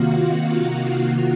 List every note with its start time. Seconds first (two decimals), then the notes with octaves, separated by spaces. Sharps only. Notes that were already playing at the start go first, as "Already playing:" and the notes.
Already playing: C3 D#3 A#3 F4 F#4 F5 F#5
0.19 F4 F5